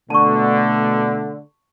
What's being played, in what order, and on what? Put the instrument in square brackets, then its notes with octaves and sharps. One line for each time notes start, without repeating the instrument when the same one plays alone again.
[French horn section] B2 A3 [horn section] D3 [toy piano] A5 C#6